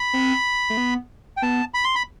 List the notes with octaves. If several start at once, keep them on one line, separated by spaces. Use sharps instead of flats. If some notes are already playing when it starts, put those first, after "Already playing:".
Already playing: B5
C4
A3
B3
G5
B3 A5
B5
C6
B5